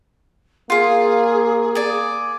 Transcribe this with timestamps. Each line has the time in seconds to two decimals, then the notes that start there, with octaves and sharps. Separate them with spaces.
0.70 A#3 F4 G#4 F5
1.75 G#4 D5